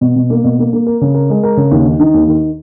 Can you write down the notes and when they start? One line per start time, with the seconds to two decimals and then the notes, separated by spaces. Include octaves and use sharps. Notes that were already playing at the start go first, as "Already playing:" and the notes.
0.01 B2
0.16 B2
0.30 A#3
0.44 B2
0.59 A#3
0.73 A#3
0.86 A#4
1.01 C#3
1.14 A#4
1.30 G#3
1.43 A#4
1.57 C#3
1.71 D#2
1.86 D#3
2.00 D#3
2.14 D#2
2.28 D#3